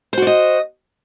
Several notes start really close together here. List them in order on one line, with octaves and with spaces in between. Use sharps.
C5 F#4 D5 D#5